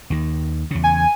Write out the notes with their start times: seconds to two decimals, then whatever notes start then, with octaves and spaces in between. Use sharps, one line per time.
0.10 D#2 D#3
0.71 E2 C#3
0.84 G#5